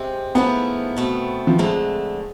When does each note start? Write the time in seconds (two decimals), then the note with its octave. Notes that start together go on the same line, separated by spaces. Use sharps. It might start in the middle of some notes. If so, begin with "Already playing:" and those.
Already playing: C3 G#3 C4
0.35 G#2 F3 A3 B3 E4 G#4
0.97 B2 A3 C4
1.47 F3
1.59 F2 D3 G#3 A3